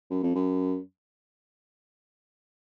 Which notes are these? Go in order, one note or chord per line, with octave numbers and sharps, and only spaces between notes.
F#2
F2
F#2